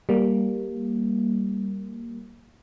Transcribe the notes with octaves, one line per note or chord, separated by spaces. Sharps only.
G3 A#3